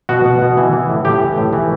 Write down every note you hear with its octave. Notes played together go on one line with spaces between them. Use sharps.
B2 F#4
B2
B2
E3
E3
A2
A2 G4
E3
A2
E3